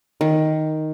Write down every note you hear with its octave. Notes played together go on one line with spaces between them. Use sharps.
D#3